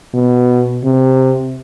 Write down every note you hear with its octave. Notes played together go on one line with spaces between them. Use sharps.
B2
C3